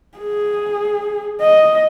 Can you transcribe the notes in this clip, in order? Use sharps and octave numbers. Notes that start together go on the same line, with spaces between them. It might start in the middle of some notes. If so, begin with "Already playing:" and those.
G#4
D#5